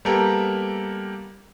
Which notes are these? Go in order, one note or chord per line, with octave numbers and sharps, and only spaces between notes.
G3 A#3 B3 G4 A4 A#4